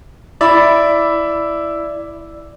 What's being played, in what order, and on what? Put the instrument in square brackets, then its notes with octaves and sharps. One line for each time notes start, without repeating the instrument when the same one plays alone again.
[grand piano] E4 E5 B5 [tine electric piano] D5